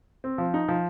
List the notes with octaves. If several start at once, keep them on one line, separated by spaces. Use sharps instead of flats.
C4
F3
D#4
F3